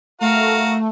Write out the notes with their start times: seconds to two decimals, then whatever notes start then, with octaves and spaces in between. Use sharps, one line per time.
0.21 A3 F#4 A#4 F5